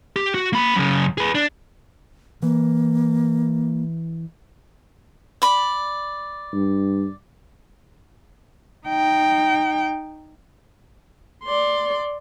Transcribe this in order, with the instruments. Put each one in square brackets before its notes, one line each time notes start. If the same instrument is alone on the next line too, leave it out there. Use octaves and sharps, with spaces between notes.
[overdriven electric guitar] G4
F#4
A#3 B5
F#2 C#3
G#4 B4
D4
[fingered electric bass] E3 [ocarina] A#3
[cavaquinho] D5 B5
[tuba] G2
[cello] D#4 G5
[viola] D5 C6